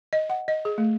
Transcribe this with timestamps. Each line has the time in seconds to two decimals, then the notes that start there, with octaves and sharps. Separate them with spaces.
0.13 D#5
0.30 F#5
0.48 D#5
0.65 G#4
0.78 A3